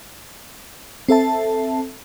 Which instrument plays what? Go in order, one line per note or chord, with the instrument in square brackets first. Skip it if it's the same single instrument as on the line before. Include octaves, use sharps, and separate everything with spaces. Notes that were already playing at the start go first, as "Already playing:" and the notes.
[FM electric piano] C4 A4 E5 A5